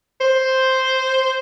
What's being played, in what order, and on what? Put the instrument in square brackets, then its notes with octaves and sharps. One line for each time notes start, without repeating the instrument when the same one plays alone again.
[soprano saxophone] C5